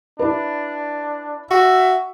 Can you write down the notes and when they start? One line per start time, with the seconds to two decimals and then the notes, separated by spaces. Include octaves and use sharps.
0.19 D4 E4 B4
1.51 F#4 E5